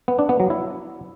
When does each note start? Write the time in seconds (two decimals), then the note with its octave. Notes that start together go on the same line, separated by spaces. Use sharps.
0.08 B3
0.19 D4
0.29 B3
0.40 F#3
0.50 E4